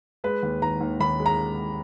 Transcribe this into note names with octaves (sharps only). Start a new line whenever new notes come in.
G#3 B4
D#2
D#3 A#5
D#2
D#2 B5
G#3
A#5